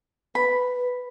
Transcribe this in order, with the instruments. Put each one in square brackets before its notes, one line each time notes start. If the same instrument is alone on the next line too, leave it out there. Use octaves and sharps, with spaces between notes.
[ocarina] B4 [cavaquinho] B5